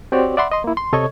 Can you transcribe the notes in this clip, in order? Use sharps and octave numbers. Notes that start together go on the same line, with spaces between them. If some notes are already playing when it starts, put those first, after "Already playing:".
C4 F#4 G4 C#5 D5
D5 E5 F#5 B5 C6
D#5 C6
A#3 E4
C6
C3 A4 C#5 D#5 C#6 G#6